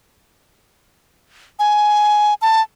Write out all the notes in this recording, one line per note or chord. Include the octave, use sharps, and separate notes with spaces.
G#5
A5